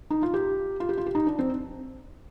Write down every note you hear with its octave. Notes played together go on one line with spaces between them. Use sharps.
D#4
F4
G4
F4
G4
F4
G4
D#4
D4
C4